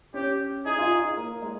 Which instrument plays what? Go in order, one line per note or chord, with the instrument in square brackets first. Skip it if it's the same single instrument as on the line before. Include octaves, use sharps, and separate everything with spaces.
[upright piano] C#4 [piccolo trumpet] G4
[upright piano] D#4 [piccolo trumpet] G#4
[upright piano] F4
D#4
A#3
G#3